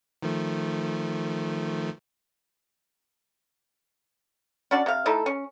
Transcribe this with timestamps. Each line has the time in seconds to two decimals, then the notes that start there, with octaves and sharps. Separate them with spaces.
0.22 D#3 F3 A3
4.71 C#4 D4 F#4 D5
4.86 C3 F5
5.06 A3 D#4 E4 A4
5.26 C#4